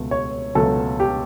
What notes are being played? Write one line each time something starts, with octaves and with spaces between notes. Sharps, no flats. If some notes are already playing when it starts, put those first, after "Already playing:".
Already playing: C#2 B2 A3
C#5
C#2 B2 F#3 A3 A4
G4